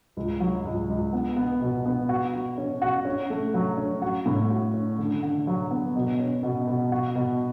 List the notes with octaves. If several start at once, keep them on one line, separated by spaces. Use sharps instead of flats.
C#2
F#3
C#2
C#2
B3
B3
B2
B3
F#4
F#4
C#4
F#4
C#4
A3
F#3
C#4
F#4
A2
F#4
C#4
D3
D3
F#3
B3
B2
C#4
B2
B2
F#4
B2